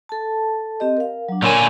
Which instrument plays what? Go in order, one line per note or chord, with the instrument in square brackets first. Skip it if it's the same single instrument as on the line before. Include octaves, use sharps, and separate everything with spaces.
[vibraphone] A4 A5
C4 G4 D#5
A#4 F5
F#3 D4
[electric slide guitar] A#2 D3 G#5 [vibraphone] A#4 C#5 C#6